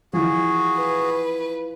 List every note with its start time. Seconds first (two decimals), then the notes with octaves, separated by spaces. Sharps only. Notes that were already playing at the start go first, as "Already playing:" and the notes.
0.13 E3 F3 F#4 G#4
0.75 B4